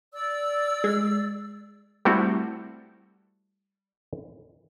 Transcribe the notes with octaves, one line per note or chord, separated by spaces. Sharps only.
D5 E6
G#3
G3 A3 C4 E4 F#4 A4